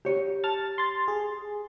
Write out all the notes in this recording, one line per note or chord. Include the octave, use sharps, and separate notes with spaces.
G4 C#5
A5 F6 A6
C6 A6
G#4